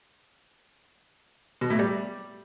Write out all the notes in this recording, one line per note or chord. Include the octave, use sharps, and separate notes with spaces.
B2
A2
G3